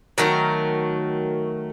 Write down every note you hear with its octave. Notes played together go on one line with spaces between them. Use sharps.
D#3 F#3 A3 A#4